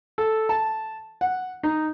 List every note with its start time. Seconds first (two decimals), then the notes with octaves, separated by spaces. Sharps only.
0.18 A4
0.49 A5
1.21 F#5
1.63 D#4